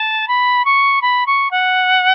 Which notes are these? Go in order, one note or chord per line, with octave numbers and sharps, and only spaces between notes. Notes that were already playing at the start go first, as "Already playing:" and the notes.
Already playing: A5
B5
C#6
B5
C#6
F#5